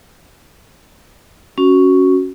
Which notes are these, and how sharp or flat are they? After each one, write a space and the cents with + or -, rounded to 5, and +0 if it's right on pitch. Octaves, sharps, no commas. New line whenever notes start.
C#4 +0 F#4 +0